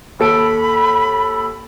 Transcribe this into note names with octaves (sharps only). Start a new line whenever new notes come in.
D#2 A4 B5 D7